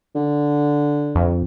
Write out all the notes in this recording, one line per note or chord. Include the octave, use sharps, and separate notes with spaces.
D3
F2